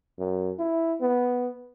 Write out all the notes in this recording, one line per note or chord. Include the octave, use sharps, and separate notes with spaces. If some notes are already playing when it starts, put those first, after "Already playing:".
F#2
E4
B3